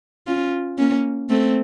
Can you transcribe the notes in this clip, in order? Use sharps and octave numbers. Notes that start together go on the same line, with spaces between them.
C#4 F4
A#3 C#4
A3 C4